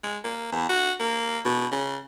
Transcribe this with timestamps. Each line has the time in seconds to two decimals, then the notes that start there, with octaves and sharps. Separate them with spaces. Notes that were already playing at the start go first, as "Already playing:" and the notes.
0.03 G#3
0.24 A#3
0.52 E2
0.69 F#4
1.00 A#3
1.45 B2
1.72 C#3